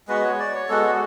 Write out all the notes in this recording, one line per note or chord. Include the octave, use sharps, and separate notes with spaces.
G#3 B3 F#4 B4
C#5
D5
C#5
G#3 B3 F#4 A4
F#4